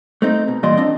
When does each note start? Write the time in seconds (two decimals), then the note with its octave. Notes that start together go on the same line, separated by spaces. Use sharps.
0.22 A3 C4 D#4
0.48 B2
0.63 G2 A#2 E3 D5 D#5 C6
0.77 C4 D4 D#5